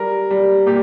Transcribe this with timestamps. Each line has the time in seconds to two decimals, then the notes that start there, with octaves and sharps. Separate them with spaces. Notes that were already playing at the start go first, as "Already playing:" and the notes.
Already playing: G3 A#4
0.31 G3
0.66 A#2 G4